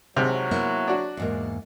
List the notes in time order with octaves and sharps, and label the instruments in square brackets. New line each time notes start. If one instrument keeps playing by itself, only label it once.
[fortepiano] G#1 C3 [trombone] F#3
[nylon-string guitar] A#3 B3 E4
[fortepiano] D4 F#4
[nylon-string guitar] E2 G#2 A#3